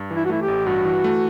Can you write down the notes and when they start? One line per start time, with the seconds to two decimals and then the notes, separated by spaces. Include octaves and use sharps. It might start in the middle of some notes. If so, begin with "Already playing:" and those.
Already playing: G2
0.11 E3
0.16 E4
0.25 F#4
0.29 A3 E4
0.42 G4
0.48 A1
0.66 G2 F#4
0.85 E3
1.04 A3